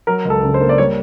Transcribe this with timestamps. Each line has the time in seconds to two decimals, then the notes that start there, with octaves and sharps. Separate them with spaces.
0.07 F#3 A#4
0.25 C#2
0.30 A4
0.43 C#3
0.54 C5
0.61 A#3
0.69 D5
0.78 G3 C#5